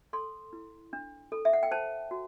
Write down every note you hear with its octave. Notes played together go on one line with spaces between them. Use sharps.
A4 C6
E4
D4
A4
E5
F#5
G5
C5 A5
F#4